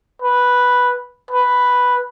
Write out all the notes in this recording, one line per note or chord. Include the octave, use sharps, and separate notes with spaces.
B4
B4